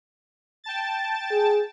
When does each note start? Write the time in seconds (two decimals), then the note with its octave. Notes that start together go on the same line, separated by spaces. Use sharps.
0.64 G5 A5 A6
1.31 G#4